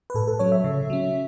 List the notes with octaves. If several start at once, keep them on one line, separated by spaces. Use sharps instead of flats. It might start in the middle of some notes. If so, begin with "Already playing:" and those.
B4
A2 A4
A4
F#3 C#4 C#5
E5
C#3
F#3 C#4